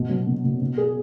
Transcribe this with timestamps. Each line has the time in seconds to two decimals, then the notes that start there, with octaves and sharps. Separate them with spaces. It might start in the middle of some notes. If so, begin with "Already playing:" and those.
Already playing: B2
0.09 F#3
0.27 B2
0.44 B2
0.61 B2
0.78 G#4